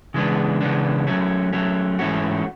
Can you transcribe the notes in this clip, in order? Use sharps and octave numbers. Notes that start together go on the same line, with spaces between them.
C#3 E3 G#3 B3 D4
C#3 E3 G#3 B3 D4
F#3 A3 C#4
F#3 A3 C#4
G#2 E3 A3 C#4 F#4